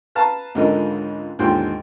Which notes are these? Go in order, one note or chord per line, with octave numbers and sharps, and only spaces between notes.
B4 F5 A5 A#5
C#2 G#2 D3 F4 A#4 D#5
D#2 G#2 D3 F4 G5 C6